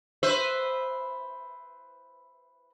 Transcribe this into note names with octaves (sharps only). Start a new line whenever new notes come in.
B4 C5 E5